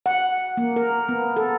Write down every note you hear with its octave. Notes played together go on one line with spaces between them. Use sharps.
F#5
A#3
A#4
B3
A4